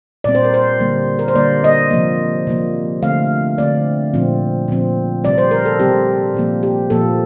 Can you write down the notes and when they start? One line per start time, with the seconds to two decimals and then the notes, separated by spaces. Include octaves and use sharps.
0.24 A#2 G3 C4 D5
0.35 C5
0.45 A#4
0.54 C5
0.80 D3 G3 A#3
1.19 A#4
1.28 C5
1.35 D3 G3 A#3 D5
1.64 D#5
1.91 C3 F3 A#3
2.47 C3 F3 A#3
3.02 D3 A3 C4 F5
3.58 D3 A3 C4 D5
4.14 A#2 F3 C4
4.68 A#2 F3 C4
5.24 C3 G3 C4 D5
5.38 C5
5.51 A#4
5.65 A4
5.80 C3 G3 C4 G4
6.34 A#2 F3 A#3
6.63 G4
6.90 A#2 F3 A#3 A4